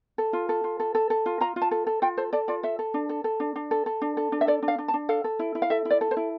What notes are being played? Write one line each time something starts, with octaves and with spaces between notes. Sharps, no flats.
A4
F4
A4
F4
A4
A4
A4
F4
F4 A#5
F4
A5
A4
A4
F4 G5
A4 C5
A4 D5
F4 D5
A4 E5
A4
D4
A4
A4
D4
D4
A4
A4
D4
A4
D4
E5
A4 D5
D4
F5
D4
A5
D4
A4 F5
A4
E4
E4
F5
A4 E5
E4
D5
A4
C5
E4